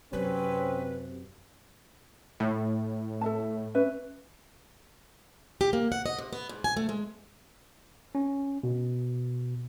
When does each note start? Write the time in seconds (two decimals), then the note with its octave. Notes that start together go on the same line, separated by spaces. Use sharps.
0.13 F#2 C3 C4 C#4 B4
2.40 A2
3.21 A4 E5 A5
3.75 C#4 B4 E5
5.61 G4
5.73 A#3
5.92 F#5
6.06 D#5
6.19 C3
6.33 B3
6.49 G#2
6.64 G#5
6.77 A3
6.89 G#3
8.15 C#4
8.63 B2